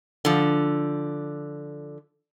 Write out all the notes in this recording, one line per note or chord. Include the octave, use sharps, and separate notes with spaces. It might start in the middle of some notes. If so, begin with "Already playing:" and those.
D3 F3